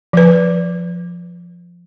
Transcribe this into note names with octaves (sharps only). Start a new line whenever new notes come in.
F3 B4